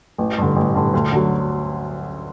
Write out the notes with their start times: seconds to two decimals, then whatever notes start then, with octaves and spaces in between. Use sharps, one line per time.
0.18 A1
0.38 G2 D3
0.56 A1
0.75 G2 D3
0.93 D2
1.12 D3 F#3